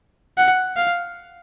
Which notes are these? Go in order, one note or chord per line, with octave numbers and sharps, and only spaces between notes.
F#5
F5